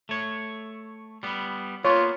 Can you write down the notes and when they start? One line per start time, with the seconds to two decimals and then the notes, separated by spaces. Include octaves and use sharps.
0.09 A3 C#5
1.23 G3 B3
1.85 A#3 B3 F4 C#5